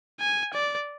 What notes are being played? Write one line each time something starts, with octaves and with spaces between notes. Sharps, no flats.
G#5
D5